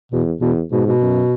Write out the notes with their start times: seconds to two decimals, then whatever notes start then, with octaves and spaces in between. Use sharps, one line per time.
0.12 E2 B2
0.41 E2 B2
0.71 G#2 B2
0.86 B2
1.01 F#2